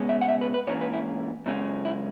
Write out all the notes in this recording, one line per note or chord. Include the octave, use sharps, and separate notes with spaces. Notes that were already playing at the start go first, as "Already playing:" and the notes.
Already playing: C#2 B2 G#3 C#4
E5
F#5
E5
B4
B4
G#2 E3 A#3 C#4 C#5
B4
E4
F#2 C#3 G#3 C#4
E4